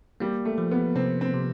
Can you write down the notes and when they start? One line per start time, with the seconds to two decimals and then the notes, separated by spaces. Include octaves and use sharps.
0.20 G3 A#3
0.45 A3
0.58 F3
0.71 B3
0.96 C3 C4
1.21 C4
1.34 C3